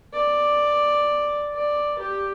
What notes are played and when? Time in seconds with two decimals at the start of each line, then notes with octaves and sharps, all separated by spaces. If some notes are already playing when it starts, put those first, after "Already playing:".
0.13 D5
1.53 D5
1.99 G4